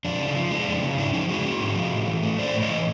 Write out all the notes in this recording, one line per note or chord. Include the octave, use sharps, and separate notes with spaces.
F2 D4
C#3
F3
G#3 D4
F2
C#3
G#2 D4 E4
F3 C#4 D#4
G#3 F#4 G#4
C#4
G#2
F3
A2
E3
A3
A2 C5 D5
A2
C#5 D#5
E3